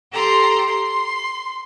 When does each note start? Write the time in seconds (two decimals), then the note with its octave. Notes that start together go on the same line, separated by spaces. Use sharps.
0.12 G4 A4 A#5 C6
0.67 C6